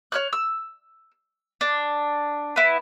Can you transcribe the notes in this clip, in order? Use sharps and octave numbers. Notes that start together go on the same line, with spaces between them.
C#5 F6 F#6
E6
D4
B3 E4